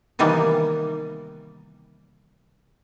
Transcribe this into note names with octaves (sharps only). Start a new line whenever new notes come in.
C3 D#3 E3 G3 A#3 B3